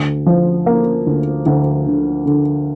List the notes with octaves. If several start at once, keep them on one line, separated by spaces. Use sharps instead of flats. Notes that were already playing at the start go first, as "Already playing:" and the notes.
Already playing: D2
F3
A#3
D2
D2
D3
D3